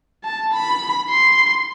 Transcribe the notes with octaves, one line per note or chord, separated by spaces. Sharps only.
A5
B5
C6